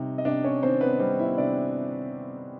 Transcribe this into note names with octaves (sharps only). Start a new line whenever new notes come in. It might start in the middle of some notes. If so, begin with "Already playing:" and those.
Already playing: C3 G3 D#4
D#5
C3 D4 D5
C#4 C#5
D#3 C4 C5
B3 B4
G3 C4 C5
E4 E5
C3 D4 D5